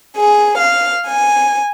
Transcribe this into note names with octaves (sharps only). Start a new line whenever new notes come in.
G#4
F5
G#5